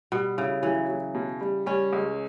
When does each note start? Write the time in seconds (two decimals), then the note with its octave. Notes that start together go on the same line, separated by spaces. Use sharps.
0.12 B2 G3
0.38 C#3 E4
0.63 E3 F#3
0.89 F#3
1.15 B2
1.41 G3
1.66 G3 C#4
1.93 C#2